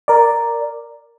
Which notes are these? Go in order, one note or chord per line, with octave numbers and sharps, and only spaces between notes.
A#4 D5